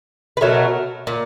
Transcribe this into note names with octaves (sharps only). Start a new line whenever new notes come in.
B4
B2 F#3 A3 A#4
A#2